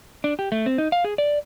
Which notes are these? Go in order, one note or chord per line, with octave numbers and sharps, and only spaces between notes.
D4
G4
A3
C4
D#4
F5
G#4
D5